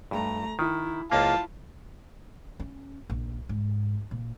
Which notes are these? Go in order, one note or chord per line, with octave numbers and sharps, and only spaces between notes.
G2 A3 A#5
D#3 E4
C#2 A#3 E4 F4 A5
C#4
A#1
G#2
A#2